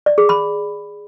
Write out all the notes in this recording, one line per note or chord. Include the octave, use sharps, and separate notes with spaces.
D5
G#4
B5